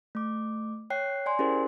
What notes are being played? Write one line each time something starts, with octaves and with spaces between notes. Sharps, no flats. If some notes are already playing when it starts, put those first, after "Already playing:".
A3 D6
C#5 G5 F#6 C7
D5 G#5 C6
C#4 E4 G4 G#4 A#4 C5